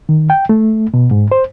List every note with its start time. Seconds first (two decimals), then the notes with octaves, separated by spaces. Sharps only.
0.09 D#3
0.30 G5
0.49 A3
0.94 B2
1.11 G#2
1.32 C5